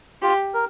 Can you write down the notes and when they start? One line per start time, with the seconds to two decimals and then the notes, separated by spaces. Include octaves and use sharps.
0.22 F4 G4
0.54 A#4